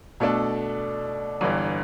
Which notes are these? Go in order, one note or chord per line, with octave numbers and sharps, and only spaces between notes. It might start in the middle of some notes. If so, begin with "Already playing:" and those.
B2 A3 D4 A4
G1 G2 E3